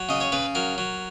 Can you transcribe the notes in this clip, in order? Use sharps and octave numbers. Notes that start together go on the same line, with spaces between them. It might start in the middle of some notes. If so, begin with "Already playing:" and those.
Already playing: F#3
C#3 D#5
C#5
C#3 B4
F#3 A#4
F#3